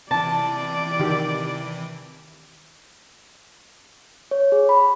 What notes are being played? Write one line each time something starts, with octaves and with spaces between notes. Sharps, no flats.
C3 E3 D5 A5
D#3 G4
C#5
G#4
B5